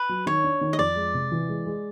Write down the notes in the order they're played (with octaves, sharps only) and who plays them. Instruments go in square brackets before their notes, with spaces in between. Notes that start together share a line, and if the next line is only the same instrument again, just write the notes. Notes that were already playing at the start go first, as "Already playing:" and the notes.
Already playing: [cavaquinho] B4
[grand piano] F#3
[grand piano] D#3 [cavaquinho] C#5
[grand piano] D4
D#3
[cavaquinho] D#5
[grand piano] F2 [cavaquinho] D5
[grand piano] G#3
C3
E3
G#3
G#3